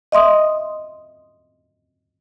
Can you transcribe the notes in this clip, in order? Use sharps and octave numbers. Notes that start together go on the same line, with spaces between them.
D#5 E5 C6 D#6